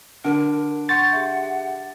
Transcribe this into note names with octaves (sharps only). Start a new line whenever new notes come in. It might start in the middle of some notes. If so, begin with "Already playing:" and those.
D3 A#4 D7
F#5 C6 C#6 G6 A6
G4 G#4 E5